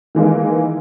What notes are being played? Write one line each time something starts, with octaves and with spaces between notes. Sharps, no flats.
D#3 E3 G#3 A#3